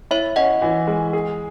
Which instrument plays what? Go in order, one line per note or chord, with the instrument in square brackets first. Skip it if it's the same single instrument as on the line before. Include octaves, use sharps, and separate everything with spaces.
[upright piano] E4 [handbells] C#5 E5
[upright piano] C#4 [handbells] D#5 F#5
[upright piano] E3
G#3
G#4